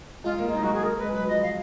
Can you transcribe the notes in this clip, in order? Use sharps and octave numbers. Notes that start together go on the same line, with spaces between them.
G#3 F4
A#3
G#3
D#4
F#3
G#3 F#4
G#4
A#4
G#3 B4
F#3 B4
F3 D#5
F5